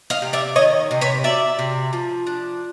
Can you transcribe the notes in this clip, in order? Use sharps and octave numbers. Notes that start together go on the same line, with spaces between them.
D#5 F5
C3
D5 E5
D#3 C#5 D#5
C3
B4 C#5
F#3 D5 E5
C3
F3
D4